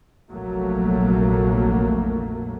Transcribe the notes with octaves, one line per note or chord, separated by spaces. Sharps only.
F1 A#1 F#3 A3 A#3